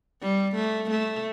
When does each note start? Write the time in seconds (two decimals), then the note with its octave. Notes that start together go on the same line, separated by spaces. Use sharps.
0.21 G3
0.55 A3
0.90 A3